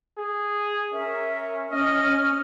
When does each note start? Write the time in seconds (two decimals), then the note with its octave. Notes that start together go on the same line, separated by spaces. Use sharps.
0.17 G#4
0.93 C#4 A#4 E5
1.71 C#4 D#5 F6